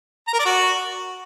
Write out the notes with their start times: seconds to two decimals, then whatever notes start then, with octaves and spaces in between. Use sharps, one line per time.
0.28 A#5
0.33 A#4
0.39 D5
0.45 F#4